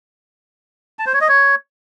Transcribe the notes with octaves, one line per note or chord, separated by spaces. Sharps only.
A5
C5
C#5
D#5
C#5